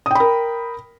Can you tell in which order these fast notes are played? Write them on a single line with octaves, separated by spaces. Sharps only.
D#6 G5 B5 A#4